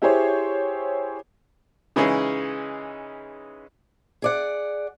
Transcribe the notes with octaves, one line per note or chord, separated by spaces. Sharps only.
E4 G4 G#4 C5 C#5
C#3 E3 G#3 C#4 D#4 G#4
G#4 D5 F#5